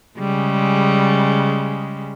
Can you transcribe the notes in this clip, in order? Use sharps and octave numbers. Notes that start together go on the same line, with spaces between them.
C#3 G3 G#3